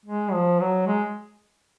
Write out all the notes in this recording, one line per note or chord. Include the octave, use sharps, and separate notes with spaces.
G#3
F3
F#3
G#3